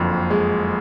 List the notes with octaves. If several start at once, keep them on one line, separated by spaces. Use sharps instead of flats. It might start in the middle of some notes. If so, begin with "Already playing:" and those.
Already playing: F#1 F2 D3
G#3